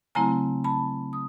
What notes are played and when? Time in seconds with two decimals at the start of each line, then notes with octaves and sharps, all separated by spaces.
0.15 C#3 F#3 A3 C4 E4 G#5 A#5
0.64 A5 B5
1.13 D#6